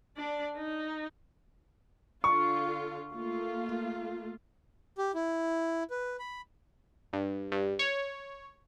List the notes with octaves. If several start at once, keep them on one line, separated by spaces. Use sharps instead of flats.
D4 D5
D#4
D3 F4 C#6
A3 A#3 F4
G4
E4
B4
B5
G2
G2
C#5